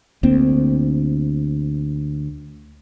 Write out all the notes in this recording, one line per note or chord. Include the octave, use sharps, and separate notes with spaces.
D2 A#3 C4 D4